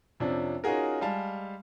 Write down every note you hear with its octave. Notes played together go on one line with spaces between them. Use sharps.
F2 C3 F3 C#4 D4
C#4 D#4 F4 F#4 G#4 A#4
G3 G#3 F5 G#5 A5